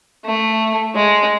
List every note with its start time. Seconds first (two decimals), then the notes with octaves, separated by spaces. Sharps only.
0.25 A3
0.95 G#3